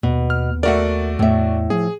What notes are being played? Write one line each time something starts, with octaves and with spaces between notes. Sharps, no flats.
D#2 B2
F6
A3 F#4 A#4 D5 E5 F#5
E2 A2 E5
F3 G#4